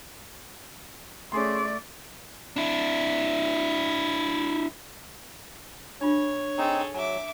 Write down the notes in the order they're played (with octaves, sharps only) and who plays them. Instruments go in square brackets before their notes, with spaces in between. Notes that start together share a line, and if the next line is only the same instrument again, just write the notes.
[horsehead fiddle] A3 D5 [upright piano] C#4 G#4 C6
[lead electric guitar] D4 E4
[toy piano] D4 F4 [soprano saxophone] C#5
[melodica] C4 D#4 [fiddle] G#4 A4
[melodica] F#3 [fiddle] E5 D6 [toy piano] G#5